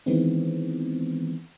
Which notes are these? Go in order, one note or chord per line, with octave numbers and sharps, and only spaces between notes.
D#3 E3 G#3 B3 C4